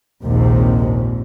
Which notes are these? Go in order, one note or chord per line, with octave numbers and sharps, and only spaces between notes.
A#1 D#2 G#2 C3